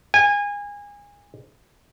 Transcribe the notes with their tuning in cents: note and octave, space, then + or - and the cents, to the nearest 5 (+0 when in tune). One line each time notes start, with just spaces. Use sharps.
G#5 -25